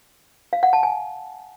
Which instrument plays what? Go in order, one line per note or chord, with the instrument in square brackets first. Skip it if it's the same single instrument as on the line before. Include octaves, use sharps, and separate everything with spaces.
[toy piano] F5
F#5
A5
G#5